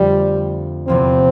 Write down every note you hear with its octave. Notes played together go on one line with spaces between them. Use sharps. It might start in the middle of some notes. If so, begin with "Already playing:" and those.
Already playing: F2 D3 F3 G3 A3
E2 C3 F3 A#3 C4